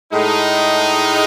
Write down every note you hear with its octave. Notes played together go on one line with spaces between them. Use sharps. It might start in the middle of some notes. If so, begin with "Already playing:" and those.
A2 G#3 D#4